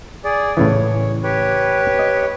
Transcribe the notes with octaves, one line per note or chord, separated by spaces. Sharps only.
G#4 D5
A2 C#3 E3 C#5
G4 B4 C#5
D#5